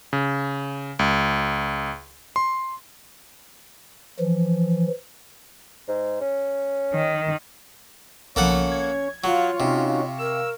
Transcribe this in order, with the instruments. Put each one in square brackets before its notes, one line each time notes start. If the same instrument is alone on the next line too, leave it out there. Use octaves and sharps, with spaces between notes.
[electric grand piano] C#3
C#2
C6
[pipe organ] E3 F3
[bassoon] G#2
C#4
[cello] D#3
[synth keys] B1 C#3 F3 [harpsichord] A#3 A4 F#5 [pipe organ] C#4 C#5
[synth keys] G#6
[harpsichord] F#3 [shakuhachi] F4 [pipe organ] C#5 [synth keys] F5 C#6
[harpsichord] C3 [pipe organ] C#4 D#4 F#4
[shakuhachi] A#4 [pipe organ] E6